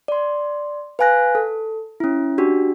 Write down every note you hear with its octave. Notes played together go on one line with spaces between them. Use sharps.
D5 C6
B4 F5 G#5 F#6 A#6
A4
C#4 E4
D4 F#4 G4